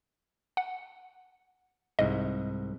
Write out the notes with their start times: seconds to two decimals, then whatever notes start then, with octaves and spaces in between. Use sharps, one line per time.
0.57 F#5
1.99 C2 G#2 D#5